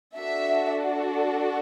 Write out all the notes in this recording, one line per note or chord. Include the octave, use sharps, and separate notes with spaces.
D4 F#4 A4 E5